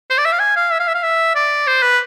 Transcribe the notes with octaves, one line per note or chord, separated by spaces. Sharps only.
C5
D5
E5
F5
G#5
F5
E5
F5
E5
F5
E5
D5
C5
B4